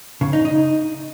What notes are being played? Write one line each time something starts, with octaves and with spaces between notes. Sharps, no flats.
C#3
D#4
D#4